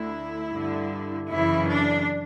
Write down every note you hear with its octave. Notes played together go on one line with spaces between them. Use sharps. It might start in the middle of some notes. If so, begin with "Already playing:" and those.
Already playing: D2 D3 E4
G2 D3
F#2 C#3 E3 E4
D4